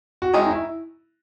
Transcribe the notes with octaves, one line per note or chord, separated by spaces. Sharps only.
F#4
D#3 G#3 C#4 E4
D#4
E4